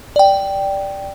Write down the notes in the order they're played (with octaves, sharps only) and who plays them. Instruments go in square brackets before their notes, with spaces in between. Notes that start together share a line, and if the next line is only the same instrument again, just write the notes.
[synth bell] D5 G5